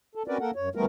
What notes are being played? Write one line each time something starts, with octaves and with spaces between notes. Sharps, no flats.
A4
C4 C#4 F#4 A#4 B4 D5
A#3 A4 A#4 F#5
F#2 C#5
D2 E3 G3 A3 B3 A#4